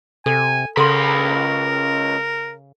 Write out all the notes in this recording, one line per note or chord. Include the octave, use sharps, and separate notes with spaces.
C3 A4 G#5
C#2 C#3 A4 A#4 F#5 B5 C6